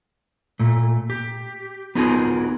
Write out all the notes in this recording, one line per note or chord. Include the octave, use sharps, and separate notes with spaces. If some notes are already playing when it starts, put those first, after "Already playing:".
A#2 A3
G4
B3 D#4 F4 F#4 G#4 A#4